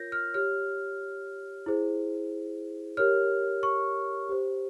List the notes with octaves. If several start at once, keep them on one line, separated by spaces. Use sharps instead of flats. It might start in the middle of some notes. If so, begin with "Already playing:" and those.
Already playing: F4 A#4 C#5 G6 A#6
F6
G4 C#5 F6
E4 G#4 C5
G4 A#4 C#5 F6
C#6
G4 C5